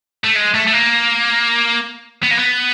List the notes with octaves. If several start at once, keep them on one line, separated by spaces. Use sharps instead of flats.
A3
G#3
A3
A3
A#3
B3
A#3
B3